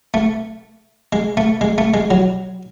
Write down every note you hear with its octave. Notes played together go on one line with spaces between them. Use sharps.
A3
G#3
A3
G#3
A3
G#3
F#3